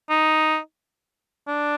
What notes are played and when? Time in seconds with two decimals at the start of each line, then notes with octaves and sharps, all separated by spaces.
0.10 D#4
1.48 D4